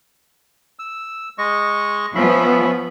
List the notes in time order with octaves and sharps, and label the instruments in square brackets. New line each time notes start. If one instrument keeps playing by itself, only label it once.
[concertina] E6
G#3 D#5 C#6
[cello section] F3 B3 [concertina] C#4 E5 B5